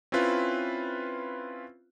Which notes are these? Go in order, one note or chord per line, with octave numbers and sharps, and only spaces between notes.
C4 C#4 E4 F4 B4